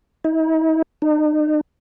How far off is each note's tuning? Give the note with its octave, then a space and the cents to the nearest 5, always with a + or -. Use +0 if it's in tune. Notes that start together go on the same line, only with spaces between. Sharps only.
D#4 +45
D#4 -40